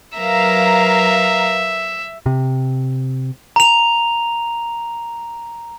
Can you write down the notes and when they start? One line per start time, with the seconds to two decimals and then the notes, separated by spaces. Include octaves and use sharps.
0.18 F#3 A#4 B4 E5 F5 A#5
2.26 C3
3.56 A#5 F7